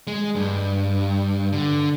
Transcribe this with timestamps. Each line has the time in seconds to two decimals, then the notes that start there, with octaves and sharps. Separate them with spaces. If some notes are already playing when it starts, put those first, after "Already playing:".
0.07 G#3
0.35 G2
1.52 D3